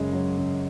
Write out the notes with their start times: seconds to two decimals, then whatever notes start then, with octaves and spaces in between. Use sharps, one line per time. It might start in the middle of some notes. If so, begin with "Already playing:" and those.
Already playing: F#2 C#3 G#3
0.13 F#3
0.37 C#3